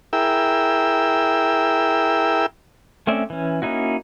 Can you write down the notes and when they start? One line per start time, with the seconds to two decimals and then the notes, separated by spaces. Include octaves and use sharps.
0.13 E4 G#4 A#4 G5 E6
3.07 A3 C4 C#4 D5 E5
3.30 E3 C#4
3.62 A#3 C#4 D#4 E4 F#4